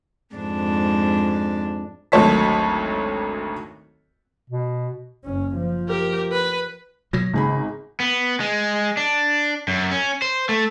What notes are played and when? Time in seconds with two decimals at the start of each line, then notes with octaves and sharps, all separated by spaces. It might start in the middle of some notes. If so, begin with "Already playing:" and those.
0.36 F2 G#2 D4
2.12 G#1 D2 F#3 C#5 A5 B6
4.50 B2
5.25 F#1 C#4
5.56 F3
5.88 G4 A#4
6.32 B4
7.13 B2 F#3 A#6
7.33 G#1 C#3 G#4 B5
8.00 B3
8.40 G#3
8.97 D4
9.68 F#2
9.91 C#4
10.22 C5
10.49 A3